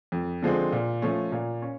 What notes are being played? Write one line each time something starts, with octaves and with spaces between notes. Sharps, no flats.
F2
D3 F3 G#3 C4
A#2
F3 A3 C#4
A#2
C#4